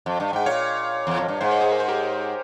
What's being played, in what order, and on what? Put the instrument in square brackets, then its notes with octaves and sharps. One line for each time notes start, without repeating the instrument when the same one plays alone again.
[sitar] F2
G2
[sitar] G#2 [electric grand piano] G5
[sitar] A#2 [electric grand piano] C#5 F5
[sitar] E2
F2
G2
[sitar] G#2 [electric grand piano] C5
[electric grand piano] C#5
G#4 C5
A#4
C5
G4 A#4